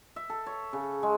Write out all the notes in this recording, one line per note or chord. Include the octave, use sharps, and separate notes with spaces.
E5
A4
C#5
C#3
G#3